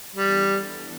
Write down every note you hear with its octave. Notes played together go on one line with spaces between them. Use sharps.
E3 G3 B3 D4 A4